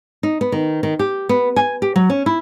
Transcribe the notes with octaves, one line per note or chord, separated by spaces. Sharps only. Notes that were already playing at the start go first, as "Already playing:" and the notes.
D#4
B3
D#3
D#3
G4
B3
G#5
G4
F#3
C#4
E4